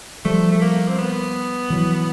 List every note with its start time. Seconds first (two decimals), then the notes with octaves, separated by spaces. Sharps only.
0.25 F3 G3 A3
0.51 A3
0.61 A#3
0.88 C4
0.98 B3
1.70 E3 F#3